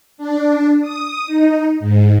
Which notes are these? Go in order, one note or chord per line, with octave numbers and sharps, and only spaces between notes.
D4
D#6
D#4
G#2